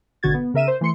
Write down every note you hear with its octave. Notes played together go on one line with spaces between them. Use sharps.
G#1 B2 D3 F#4 G#6 A6
B3
C#3 A#4 E5 D#7 E7
C5
E3 A3 C6 C#7